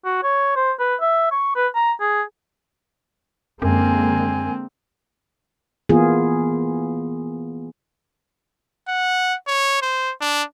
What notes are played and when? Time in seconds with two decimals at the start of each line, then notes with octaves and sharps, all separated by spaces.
0.05 F#4
0.23 C#5
0.56 C5
0.80 B4
1.01 E5
1.31 C#6
1.56 B4
1.75 A#5
2.00 G#4
3.62 F#2 D3 G#3 A#3 C4 G#5
5.89 E3 A#3 B3 F4 G#4
8.88 F#5
9.47 C#5
9.82 C5
10.21 D4